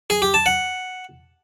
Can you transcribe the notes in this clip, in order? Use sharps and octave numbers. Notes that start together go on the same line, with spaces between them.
G#4
G4
A5
F#5